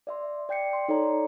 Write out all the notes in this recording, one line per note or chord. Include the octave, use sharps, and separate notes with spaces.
D5 E5 C6
D5 G5 G6 C7 C#7
C6
D#4 A4 C#5 D5 A#5